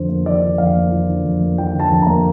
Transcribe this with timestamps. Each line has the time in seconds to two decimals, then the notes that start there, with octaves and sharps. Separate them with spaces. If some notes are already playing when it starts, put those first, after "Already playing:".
Already playing: F2 D3 F3 C5
0.09 A#3
0.26 F3 D5
0.42 D3
0.58 F2 F5
0.76 A#3
0.92 F3
1.09 D3
1.24 F2
1.42 A#3
1.58 F3 G5
1.74 D3
1.79 A5
1.90 F2
2.02 A#3 A#5